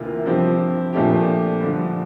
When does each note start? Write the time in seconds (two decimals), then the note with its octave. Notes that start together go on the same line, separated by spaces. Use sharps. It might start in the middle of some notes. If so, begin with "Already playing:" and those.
Already playing: D2 C3 E3 A#3 F4
0.25 G2 F3 C4 G4
0.93 A#2 F3 A3 D4 G4
1.61 G2 D3 F3